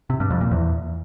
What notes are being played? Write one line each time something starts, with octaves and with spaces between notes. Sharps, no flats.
C3
G2
F2
A#2
E2